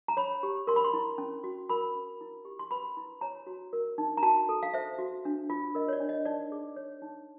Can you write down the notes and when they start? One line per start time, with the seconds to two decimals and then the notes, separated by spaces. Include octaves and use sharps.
0.08 A#5
0.17 C#5 B5
0.43 G4
0.67 A#4 C6
0.76 B5
0.85 C6
0.94 E4
1.18 C#4
1.44 F#4
1.69 A#4 B5
1.95 C#4
2.21 E4
2.45 G4
2.59 C6
2.71 B4 B5
2.97 E4
3.21 C#5 A#5
3.47 F#4
3.73 A#4
3.98 D#4
4.17 A#5
4.23 F#4 A5
4.49 A4
4.63 F5
4.74 C5 E5
4.99 F#4
5.25 D4
5.50 F4
5.75 A#4 D#5
5.88 C#5
5.93 D5
6.00 D4
6.09 D#5
6.26 D#4 D5
6.52 G#4
6.76 C#5
7.02 D#4